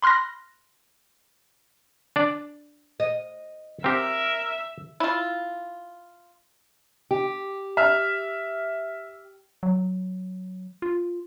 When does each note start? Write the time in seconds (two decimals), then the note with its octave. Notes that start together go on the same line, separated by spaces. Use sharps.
0.02 B5 C6 F6 F#6 A#6
2.16 D4 D5
3.00 D#5
3.84 C4 G4 A#4 E5
5.00 E4 F4
7.11 G4
7.77 E5 F6
9.63 F#3
10.82 F4